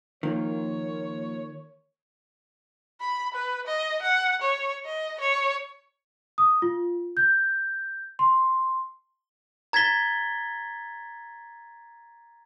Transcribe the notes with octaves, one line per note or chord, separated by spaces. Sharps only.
D#3 F3 A#3 F4 C#5
B5
B4
D#5
F#5
C#5
D#5
C#5
D#6
F4
G6
C6
A#5 G#6 A6 B6 G7